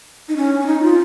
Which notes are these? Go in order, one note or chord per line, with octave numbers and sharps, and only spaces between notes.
D#4
C#4
C#4
D#4
F4